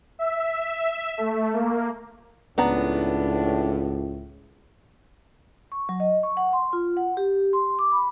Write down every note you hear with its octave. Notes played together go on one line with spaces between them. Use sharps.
E5
A3
A#3
C#2 A2 B3 D4 A#5
C#6
F#3
D#5
C#6
F#5
C6
F4
F#5
G4
C6
D6
B5